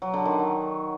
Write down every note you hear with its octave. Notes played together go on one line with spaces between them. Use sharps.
F#3
D3
D#3